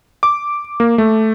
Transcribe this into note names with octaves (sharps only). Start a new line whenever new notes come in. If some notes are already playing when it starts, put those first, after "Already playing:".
D6
A#3
A3